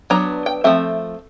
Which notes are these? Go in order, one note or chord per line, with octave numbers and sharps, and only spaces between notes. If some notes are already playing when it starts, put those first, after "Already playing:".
F#3 B3 D4 A#5
G5
F3 A3 C4 E5